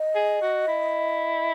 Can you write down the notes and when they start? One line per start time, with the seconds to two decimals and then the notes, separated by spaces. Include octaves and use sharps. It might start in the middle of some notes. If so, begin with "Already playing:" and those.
Already playing: D#5
0.15 G#4
0.42 F#4
0.68 E4